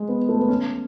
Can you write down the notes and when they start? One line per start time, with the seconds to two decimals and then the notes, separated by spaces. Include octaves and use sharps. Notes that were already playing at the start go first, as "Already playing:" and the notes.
Already playing: G#3
0.08 B3
0.29 A3
0.39 B3
0.49 C#4